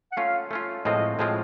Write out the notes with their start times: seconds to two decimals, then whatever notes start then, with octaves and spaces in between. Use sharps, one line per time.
0.12 F#5
0.17 A3 C#4 F4 F5
0.51 A3 C#4 F4
0.85 A2 F3 G#3 C4 F4 D#5
1.19 A2 F3 G#3 C4 F4